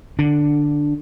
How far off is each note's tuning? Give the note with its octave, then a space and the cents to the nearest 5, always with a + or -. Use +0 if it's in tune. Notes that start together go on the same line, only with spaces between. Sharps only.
D3 +15 D4 +0